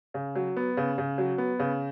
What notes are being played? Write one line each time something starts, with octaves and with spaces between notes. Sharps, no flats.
C#3
F#3
B3
C#3
C#3
F#3
B3
C#3